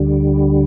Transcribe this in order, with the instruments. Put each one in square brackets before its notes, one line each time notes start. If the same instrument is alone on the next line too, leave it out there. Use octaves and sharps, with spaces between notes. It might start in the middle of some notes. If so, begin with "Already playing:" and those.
Already playing: [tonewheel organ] D2 D3 G3